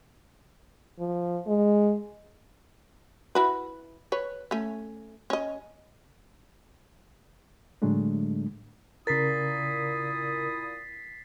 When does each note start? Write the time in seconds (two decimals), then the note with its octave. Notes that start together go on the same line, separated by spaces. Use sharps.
0.99 F3
1.47 G#3
3.35 E4 F#4 B4
4.12 B4 C#5
4.51 A3 C#4
5.30 C#4 D#5
7.82 A2 D3 F#3 G#3 A3 D4
9.07 A#2 C#3 E4 A#4 D#6 A6 B6 C7